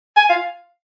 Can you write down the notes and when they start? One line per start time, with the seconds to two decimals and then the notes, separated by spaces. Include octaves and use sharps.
0.16 G#5
0.30 F5